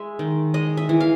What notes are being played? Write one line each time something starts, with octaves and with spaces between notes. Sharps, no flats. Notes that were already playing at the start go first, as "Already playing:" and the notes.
Already playing: G#3 E5
D#3
G#3 D#5
E5
E3
F5